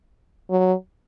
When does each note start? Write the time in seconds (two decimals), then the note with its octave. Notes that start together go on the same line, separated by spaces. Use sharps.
0.50 F#3